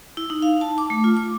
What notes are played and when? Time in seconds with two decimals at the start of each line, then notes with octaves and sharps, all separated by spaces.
0.17 E4
0.30 D#4
0.42 F5
0.61 A5
0.78 D6
0.90 A3
1.04 F4
1.17 D6